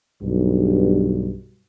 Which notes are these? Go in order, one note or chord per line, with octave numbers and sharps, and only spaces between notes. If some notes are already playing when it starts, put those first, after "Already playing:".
B1 G2